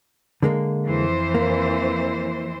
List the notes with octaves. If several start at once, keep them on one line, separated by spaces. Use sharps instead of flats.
D3 G#3 A#3
F2 E3 C5
A#3